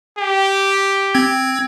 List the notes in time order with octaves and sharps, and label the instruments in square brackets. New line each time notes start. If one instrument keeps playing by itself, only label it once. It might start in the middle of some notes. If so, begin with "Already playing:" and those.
[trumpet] G4
[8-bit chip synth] C4 G#6